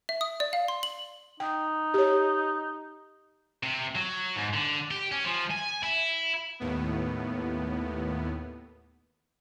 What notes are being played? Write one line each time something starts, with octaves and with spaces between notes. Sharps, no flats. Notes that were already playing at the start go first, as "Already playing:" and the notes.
E5
D#6
D5
F5
C6
F#7
D#4 G5
G4 C#5
C3
F#3
G#2
D3
G4
C#4
F3
G#5
E4
D#2 A2 B3